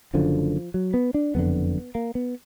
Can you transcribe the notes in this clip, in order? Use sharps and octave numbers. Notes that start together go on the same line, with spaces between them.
F#1 F#2 D3 F3
F#3
B3
D4
F#1 F2 D3 B3
A#3
B3